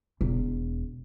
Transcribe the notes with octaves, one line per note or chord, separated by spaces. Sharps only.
E1